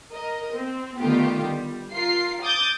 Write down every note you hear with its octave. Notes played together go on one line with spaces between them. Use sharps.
A#4 D#5
C4
D3 D#3 A3 B3 F4 G4
G3
F4 A#4 C7
D6 D#6 G6 A6